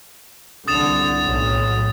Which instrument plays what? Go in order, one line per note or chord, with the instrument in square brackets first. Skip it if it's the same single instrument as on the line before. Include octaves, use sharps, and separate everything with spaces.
[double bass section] C2 D3 [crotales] D#6 A6 E7
[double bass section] B1 A2